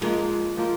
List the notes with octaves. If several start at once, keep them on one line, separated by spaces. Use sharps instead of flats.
F3 G#3 A#3 F4
F3 A#3 F4